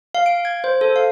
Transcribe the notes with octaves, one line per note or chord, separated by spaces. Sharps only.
F5
D7
G#6
C5
A4
F5